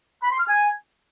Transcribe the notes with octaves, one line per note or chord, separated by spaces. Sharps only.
B5
C6
F6
G#5